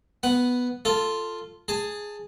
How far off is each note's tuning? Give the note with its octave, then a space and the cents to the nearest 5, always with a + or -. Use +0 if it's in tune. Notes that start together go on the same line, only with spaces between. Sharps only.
B3 +0 F#5 +0
F4 -5 A4 +5
G#4 +0 A5 +15